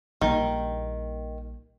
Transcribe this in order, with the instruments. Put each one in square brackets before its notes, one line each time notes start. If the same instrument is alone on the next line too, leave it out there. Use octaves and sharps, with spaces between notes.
[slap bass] A#1 G3 A#3 [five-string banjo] D#3